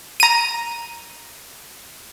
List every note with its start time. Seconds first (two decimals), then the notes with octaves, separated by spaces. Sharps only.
0.20 A#5 D#7